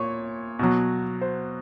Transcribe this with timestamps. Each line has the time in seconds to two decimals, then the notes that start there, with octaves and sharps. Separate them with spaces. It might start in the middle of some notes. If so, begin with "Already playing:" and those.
Already playing: A#2 C#5
0.59 B2 F#3
1.21 C5